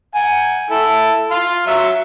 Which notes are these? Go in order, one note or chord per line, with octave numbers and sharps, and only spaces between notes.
F#5 G#5
A3 E4 A4
F5 C6
F#3 E5